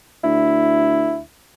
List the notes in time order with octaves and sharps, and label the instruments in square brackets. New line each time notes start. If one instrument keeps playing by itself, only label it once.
[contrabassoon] D2 [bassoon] E4